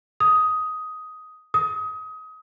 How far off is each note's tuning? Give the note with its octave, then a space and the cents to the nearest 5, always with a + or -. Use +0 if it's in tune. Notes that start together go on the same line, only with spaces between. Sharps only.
D#6 +10
D#6 +25